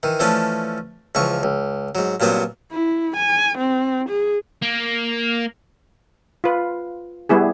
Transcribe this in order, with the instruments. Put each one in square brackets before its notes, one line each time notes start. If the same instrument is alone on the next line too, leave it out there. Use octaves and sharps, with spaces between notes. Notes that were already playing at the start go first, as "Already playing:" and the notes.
[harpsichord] D#3 E3
E3 F3 A3 C#4 D4
C#2 E3 F3 C#6
C#2
G#2 F#3
G2 A#2 F#3 B3 C4
[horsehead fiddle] E4
G#5
C4
G#4
[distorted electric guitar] A#3
[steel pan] F4 B4
G3 B3 E4 G#4